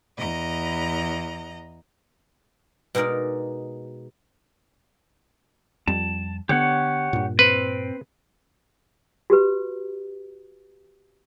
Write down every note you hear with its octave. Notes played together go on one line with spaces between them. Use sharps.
E2 D#5 A#5
B2 G#3 D#4 A#4 D5
F2 G3 A5
D3 B3 G4 C#5 F#5
G2 A#2
C4 B4
F#4 G4 B4